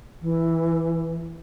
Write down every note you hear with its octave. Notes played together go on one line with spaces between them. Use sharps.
E3